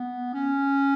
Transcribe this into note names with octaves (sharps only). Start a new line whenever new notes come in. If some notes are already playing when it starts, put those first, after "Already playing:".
Already playing: B3
C#4